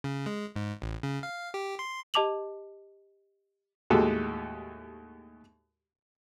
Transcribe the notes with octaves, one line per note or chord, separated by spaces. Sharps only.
C#3
G#3
G#2
A1
C#3
F5
G4
C6
G4 D#5 A5 D6 F7 F#7
D#2 A2 G#3 F#4 G4 A4